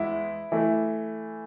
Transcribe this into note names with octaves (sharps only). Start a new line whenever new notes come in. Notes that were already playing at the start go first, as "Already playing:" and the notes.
Already playing: E2 G#3 E4
E3 A3